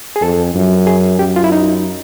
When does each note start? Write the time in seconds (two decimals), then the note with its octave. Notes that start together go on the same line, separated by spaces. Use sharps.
0.16 G#4
0.22 F2 A4
0.55 F#2
0.87 G#4
1.19 F#2 G4
1.36 F4
1.44 E4
1.52 D#4